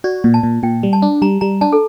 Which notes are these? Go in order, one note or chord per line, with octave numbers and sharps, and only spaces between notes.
F#4 D5
A#2
A5
A#2
A#2 G5
G3
A5
D4
G3 A#5
G3 A#5
D4 A5
A4